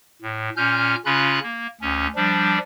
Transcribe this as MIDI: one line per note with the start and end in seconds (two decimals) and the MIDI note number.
0.22 0.50 45
0.57 0.95 46
0.57 0.95 61
0.57 0.95 89
0.57 0.95 91
1.05 1.39 49
1.05 1.39 61
1.05 1.39 65
1.05 1.39 83
1.05 1.39 90
1.43 1.67 58
1.81 2.07 38
1.81 2.07 61
2.16 2.58 53
2.16 2.58 55
2.16 2.58 62